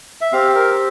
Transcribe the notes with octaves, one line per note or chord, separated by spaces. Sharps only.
E5
C4 G4 F5
A#4